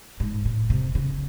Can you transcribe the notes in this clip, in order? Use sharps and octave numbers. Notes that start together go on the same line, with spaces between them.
G#2
A2
C3
C#3